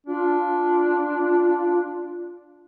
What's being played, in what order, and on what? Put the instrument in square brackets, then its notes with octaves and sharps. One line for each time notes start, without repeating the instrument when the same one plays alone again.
[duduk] D4 [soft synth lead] F4